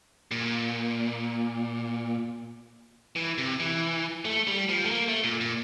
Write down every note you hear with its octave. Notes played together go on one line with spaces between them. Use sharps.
A#2
E3
C3
E3
A3
G3
F3
A3
A#3
A3
A#2
A#2